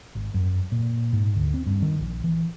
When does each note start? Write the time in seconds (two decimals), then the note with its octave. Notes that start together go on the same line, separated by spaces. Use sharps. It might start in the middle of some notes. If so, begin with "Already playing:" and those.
0.15 G#1
0.34 F#2
0.72 A#2
1.13 G#2
1.36 D2
1.54 C4
1.67 G2
1.82 D#3
2.00 A#1
2.24 E3